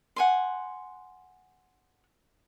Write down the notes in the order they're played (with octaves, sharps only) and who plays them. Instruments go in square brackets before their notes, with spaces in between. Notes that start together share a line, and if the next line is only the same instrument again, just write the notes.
[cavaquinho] F#5 G#5 C6